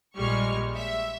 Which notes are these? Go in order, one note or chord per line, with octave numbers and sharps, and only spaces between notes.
A#1 G3 G#3 C#6 F6
E5